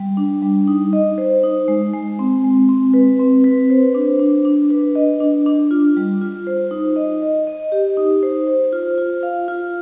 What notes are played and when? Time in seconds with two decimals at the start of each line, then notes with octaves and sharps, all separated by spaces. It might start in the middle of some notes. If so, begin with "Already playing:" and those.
Already playing: G3
0.17 D4
0.42 G3
0.68 D#4
0.93 D#5
1.18 C5
1.43 D#4
1.68 G#3
1.93 G#3
2.19 C4
2.44 G#3
2.69 C4
2.94 B4
3.20 C4
3.44 B4
3.70 C5
3.95 D4
4.19 D4
4.45 D4
4.71 B4
4.95 D#5
5.20 D4
5.46 D4
5.71 F4
5.97 G3
6.21 F4
6.47 C5
6.71 D#4
6.96 D#5
7.22 D#5
7.47 D#5
7.72 G4
7.97 D#4
8.23 C5
8.47 C5
8.73 F4
8.98 F4
9.23 F5
9.48 F4